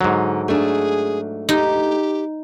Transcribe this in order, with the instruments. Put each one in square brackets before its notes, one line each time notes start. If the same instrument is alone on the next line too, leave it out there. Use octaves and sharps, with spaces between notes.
[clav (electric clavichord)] G#2 F#3 [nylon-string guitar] D3
[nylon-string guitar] A3 D4 [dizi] G#4
[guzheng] D#4 [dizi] G4